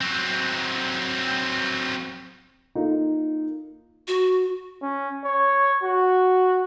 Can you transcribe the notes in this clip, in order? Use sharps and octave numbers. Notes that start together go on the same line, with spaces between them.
F#3 C4
A#3 D#4 F4 A4 F5
F#4
C#4
C#5
F#4